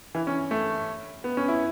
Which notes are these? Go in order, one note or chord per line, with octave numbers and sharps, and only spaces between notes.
E3
C#4
A3
B3
C#4
E4